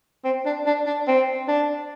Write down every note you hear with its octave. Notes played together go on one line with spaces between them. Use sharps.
C4
D4
D4
D4
C4
D4